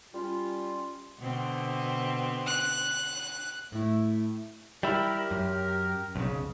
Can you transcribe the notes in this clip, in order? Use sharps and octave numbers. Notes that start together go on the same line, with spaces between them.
G3 C#4 F4
B2 D3 C4
F#6
A2 A3 E4
G3 E4 G4 A#4
F#2
B1 F2 C#3